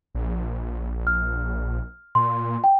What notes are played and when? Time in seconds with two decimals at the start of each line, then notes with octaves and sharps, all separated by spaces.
0.15 A#1
1.07 F6
2.15 A#2 C6
2.64 G5